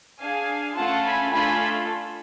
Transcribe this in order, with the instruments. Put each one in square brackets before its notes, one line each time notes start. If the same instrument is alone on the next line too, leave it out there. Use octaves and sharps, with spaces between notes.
[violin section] D4 G#4 F5 G#5
A3 C#4 F4 A4 F#5 A5
G#5 B5
A3 D4 F4 A4 G#5 B5